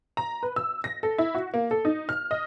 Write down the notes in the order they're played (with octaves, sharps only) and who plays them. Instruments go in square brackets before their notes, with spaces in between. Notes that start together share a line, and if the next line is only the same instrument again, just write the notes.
[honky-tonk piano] A#5
B4
E6
A#6
A4
E4
F#4
A#3
A4
D#4
F6
D#5